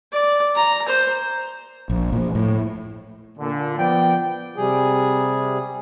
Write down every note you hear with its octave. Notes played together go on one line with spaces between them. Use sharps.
D5
A#5
C5
A#1
A#2 F3
A2
A#2 D3
F3 B3 D5 G5
C3 G3 G#4